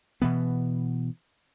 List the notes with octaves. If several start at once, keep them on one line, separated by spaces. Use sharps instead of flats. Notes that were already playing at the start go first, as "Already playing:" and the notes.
B2 E3 B3